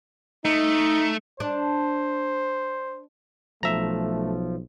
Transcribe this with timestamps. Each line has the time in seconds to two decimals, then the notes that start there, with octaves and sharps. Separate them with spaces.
0.45 A3 D#4
1.40 D4 C5
3.63 B1 F3 A3 E5 A#5